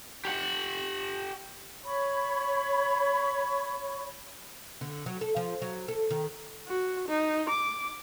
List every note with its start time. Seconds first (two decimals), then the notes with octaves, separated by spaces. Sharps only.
0.25 G4 F#5
1.83 C#5 B5 C#6
4.81 D3
5.06 F#3
5.21 A4
5.36 F3
5.62 F#3
5.88 A4
6.11 D#3
6.68 F#4
7.08 D#4
7.50 D6